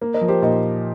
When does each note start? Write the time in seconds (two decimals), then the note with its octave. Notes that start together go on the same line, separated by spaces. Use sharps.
0.01 A#3
0.14 A#4 D#5
0.21 F3
0.28 G4 C5
0.42 A#2 D#4